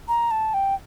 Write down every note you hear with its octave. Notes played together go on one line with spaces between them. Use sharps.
A#5
A5
G5